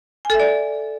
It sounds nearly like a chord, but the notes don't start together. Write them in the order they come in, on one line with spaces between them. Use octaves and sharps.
G#5 A4 E5 D5